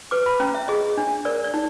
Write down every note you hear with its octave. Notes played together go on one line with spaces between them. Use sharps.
B4 D6
B5
C#4 A#5
E5
G#4 D#5
D4
A#4 D5
D5
D#4